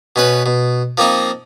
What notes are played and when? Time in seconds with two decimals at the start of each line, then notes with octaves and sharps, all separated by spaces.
0.16 B2 C#4 B4
0.46 B2
0.98 F3 A#3 C4 D#4